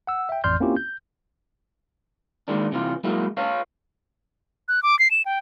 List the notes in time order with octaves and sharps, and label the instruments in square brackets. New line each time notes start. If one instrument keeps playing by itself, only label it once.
[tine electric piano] F#5 E6
E5 G5
A1 F2 D5 C6 F6 G6
A#3 C4 C#4 E4 F4 G4
G6
[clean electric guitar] D#3 G#3 A#3 D4
C3 E3 F4
F#3 G#3 A#3 E4
B4 C#5 F5
[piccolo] F#6
D6
C7
E7
G5